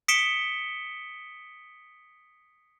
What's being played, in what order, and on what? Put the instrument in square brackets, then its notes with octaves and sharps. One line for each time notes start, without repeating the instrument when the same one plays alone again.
[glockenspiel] D#6 B6 C#7 D7 E7 G7